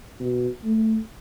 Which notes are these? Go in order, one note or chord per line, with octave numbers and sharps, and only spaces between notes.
B2
A3